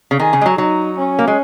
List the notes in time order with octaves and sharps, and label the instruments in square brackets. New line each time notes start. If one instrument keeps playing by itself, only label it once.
[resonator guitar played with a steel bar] C#3
[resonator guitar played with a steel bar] D#3 [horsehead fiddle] G#4
[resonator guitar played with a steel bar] C#3
G#3
F#3
[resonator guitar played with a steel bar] F#3 [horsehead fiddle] D#4
[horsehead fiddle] C#4
[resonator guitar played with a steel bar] A#3
G#3